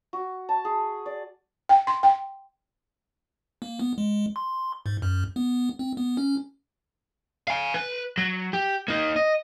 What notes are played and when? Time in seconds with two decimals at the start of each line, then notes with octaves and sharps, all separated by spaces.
0.13 F#4
0.49 A5
0.65 G#4
1.06 D5
1.69 G5
1.87 C6
2.03 G5
3.62 A#3
3.79 B3
3.98 G#3
4.36 C6
4.86 G#2
5.02 F#2
5.36 B3
5.79 C4
5.97 B3
6.17 C#4
7.48 F5 G#5
7.74 B4
8.18 F#3
8.53 G4
8.88 A#3 D#4
9.16 D#5